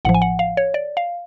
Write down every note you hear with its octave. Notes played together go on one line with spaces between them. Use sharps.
A1 A2 F3 F#5
G#5
F#5
F5
C#5
D5
F5